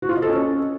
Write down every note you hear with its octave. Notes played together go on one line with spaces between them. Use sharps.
F#4
F4
D#5
A4
C#4